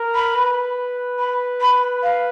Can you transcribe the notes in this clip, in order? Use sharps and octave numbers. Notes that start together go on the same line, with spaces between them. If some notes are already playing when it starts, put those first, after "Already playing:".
Already playing: A#4
B5
B4
B5
B5
F5